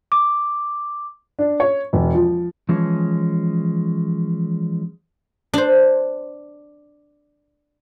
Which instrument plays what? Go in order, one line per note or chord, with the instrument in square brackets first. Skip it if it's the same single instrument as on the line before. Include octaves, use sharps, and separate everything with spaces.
[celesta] D6
[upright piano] D4
C#5
E1
F3
[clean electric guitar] E3 F3 G#3 C#4
[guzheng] D4 C5